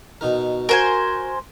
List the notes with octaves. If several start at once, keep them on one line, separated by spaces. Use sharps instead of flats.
B2 D#4 A#4
F#4 A#4 C5 G#5